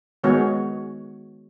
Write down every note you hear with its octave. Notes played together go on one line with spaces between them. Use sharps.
D#3 G#3 B3 F#4 C#5